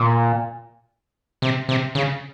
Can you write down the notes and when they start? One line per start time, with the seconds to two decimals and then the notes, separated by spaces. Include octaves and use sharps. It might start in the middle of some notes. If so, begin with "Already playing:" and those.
Already playing: A#2
1.42 C3
1.69 C3
1.95 C#3